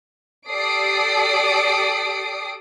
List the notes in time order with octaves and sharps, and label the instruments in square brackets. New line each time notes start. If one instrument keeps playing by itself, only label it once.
[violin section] G4 A4 D5 D#6 C7 D7